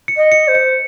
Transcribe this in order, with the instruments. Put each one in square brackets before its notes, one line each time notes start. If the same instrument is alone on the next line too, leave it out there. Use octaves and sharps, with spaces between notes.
[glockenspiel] C#7
[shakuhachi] D#5
[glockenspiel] C#7
[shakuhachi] C5
[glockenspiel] C#7